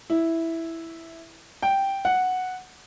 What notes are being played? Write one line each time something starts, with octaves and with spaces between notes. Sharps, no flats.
E4
G5
F#5